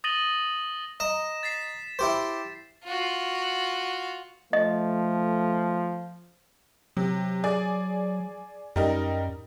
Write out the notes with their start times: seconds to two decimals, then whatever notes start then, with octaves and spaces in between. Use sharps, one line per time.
0.04 D#6 A6 A#6 D#7 F#7 G7
1.00 D#5 A#5 E7
1.43 A6 B6 C7
1.99 E4 G4 C5
2.84 F4 F#4
4.53 F3 A3 D#5
6.97 C3 F#3
7.44 G#4 D5
8.76 F#2 G3 D#4 A#4